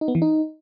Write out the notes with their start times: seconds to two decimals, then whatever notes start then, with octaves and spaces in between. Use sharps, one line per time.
0.01 D#4
0.08 B3
0.15 E3
0.22 D#4